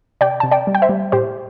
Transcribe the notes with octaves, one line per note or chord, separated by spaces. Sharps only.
C3 D5 G5
C3 A5
D5 G5
G3
G5
C5 E5
G3
A2 G4 C5